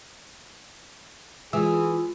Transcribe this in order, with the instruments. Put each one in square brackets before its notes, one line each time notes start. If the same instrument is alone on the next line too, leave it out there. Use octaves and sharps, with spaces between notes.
[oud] E3 [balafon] G#3 [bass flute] F4 [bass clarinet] G#4